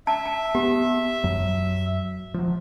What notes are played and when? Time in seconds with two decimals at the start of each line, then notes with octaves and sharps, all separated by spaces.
0.07 E5 A5
0.26 A5
0.55 B3 G4
1.24 F#2 F#3
2.34 F3 F#3